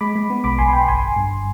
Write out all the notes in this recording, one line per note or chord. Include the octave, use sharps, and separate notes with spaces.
G#3 B5 D6
G#3
B3
B1 B5 D6
B1 G#5 C6
B1 G5 B5
G1 G#5 C6
G1
G2